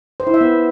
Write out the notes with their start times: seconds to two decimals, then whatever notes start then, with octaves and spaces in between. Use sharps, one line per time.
0.20 C5
0.27 E4
0.34 E5
0.41 B3